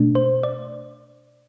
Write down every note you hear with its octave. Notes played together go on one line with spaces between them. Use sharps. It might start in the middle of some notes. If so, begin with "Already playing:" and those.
Already playing: B2 A3 D4
C5
D5